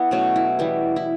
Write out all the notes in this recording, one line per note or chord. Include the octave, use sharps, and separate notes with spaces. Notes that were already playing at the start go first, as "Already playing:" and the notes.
Already playing: B3 E4
B2 F#3 A3 C#4
E4
E3 G3 B3
E4